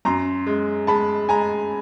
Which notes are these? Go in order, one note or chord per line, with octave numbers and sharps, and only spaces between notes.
F#2 A#5 C6
G#3
G#3 A5 B5
G#3 G#5 A#5